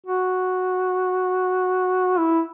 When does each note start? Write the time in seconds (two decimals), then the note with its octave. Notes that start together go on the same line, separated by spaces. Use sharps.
0.06 F#4
2.18 E4